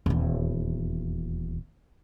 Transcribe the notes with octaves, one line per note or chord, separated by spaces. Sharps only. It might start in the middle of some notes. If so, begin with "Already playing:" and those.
D#1 E2